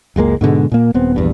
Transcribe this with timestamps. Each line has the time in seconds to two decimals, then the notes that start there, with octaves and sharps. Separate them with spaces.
0.16 F#1 C#2 G#3 A#3
0.41 G#2 B2 D3 G#3
0.72 A#2 A#3
0.94 D#1 B3 C4
1.16 A#1 E2 G2